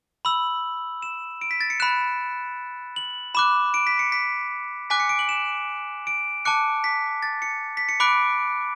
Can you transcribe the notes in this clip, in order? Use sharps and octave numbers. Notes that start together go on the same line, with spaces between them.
B5 E6 F#7
E7
D7
B6
A6
C#7
B5 F#6 E7
F#7
B5 D6 F#6 E7
D7
B6
C#7
B6
G#5 D6 F#6 B6
C#7
D7
F#7
E7
D7
A5 D6 F#6 C#7
B6
A6
C#7
B6
C#7
B5 D6 F#6 D7